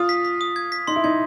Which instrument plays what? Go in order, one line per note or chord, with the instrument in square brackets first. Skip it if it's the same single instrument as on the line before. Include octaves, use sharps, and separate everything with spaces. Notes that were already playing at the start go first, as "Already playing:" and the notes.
Already playing: [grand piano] F4 [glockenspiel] D#6
[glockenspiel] B6
B6
D#6
G#6
B6
[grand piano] D#4 [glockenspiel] C6
[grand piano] E4
[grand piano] D#4 [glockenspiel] G#6